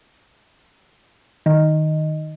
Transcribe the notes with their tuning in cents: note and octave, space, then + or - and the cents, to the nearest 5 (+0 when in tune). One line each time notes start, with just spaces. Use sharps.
D#3 +0